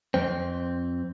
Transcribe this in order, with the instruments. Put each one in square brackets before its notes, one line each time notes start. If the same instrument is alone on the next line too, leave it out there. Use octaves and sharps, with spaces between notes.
[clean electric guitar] F2 C4